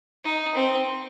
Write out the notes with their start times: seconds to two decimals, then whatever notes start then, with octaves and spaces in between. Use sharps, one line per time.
0.24 D#4
0.55 C4